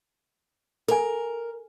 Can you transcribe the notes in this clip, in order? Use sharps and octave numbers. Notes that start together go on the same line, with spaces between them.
A4 A#4 G#5